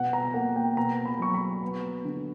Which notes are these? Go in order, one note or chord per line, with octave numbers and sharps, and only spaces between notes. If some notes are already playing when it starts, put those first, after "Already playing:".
Already playing: B2 F#5
A#5
A#3 F#5
G5
B2 A#5
B5
F#3 C#6
B5
B3
D3